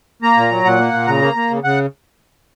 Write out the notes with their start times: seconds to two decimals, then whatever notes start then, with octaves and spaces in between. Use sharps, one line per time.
0.22 A#3 A#5
0.37 A#2
0.51 F#3
0.64 A#2 F#5
0.79 A#3
0.93 A#2
1.07 C#3 A#5
1.22 A#3
1.36 A#3
1.50 C#3
1.64 C#3 F#5